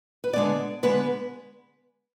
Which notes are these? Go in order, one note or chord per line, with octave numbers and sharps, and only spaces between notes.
B4
D3 G#3 B3 D5
D3 G#3 B3 B4